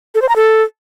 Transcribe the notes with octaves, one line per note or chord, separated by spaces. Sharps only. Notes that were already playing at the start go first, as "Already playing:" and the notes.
A4
C5
A#5
A4